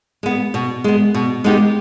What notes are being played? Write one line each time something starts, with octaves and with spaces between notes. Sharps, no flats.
G#3 B3
B2
G#3 B3
B2
G#3 B3 D#4 G4